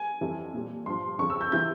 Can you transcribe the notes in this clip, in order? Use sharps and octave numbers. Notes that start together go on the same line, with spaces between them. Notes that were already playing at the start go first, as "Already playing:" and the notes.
Already playing: G#5
F2 E3 G3
A#2 G3
G2 F3 C6
F2 C#3 F3 C#6
E6
G6
C3 E3 G6